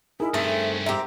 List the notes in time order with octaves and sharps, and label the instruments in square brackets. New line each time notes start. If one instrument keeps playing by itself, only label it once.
[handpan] D#4 G#4 A#4 [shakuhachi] E4
[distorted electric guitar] G2 C#4 [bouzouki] A3 C4 A4 [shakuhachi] E5
[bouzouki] C4 G4 [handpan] E5 [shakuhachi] A#5